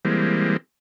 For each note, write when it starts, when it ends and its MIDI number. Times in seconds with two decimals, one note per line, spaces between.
0.05 0.57 52
0.05 0.57 55
0.05 0.57 56
0.05 0.57 58
0.05 0.57 60